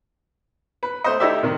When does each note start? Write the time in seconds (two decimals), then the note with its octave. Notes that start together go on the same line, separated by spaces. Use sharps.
0.83 B4
1.04 A3 C5 D#5
1.20 A3 D#4 E4 G4 D5 E5
1.43 C3 D#3